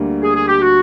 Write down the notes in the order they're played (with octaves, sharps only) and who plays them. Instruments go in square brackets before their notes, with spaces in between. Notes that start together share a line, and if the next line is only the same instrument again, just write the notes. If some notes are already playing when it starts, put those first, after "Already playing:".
Already playing: [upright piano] D2 D3 G3 A#3
[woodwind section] G#4
G#4
G4
F#4